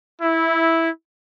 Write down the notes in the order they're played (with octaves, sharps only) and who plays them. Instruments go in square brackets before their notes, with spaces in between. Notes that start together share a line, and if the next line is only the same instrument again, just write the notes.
[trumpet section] E4